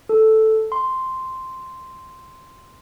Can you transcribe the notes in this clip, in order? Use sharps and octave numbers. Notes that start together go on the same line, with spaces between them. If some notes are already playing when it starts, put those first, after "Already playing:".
A4
C6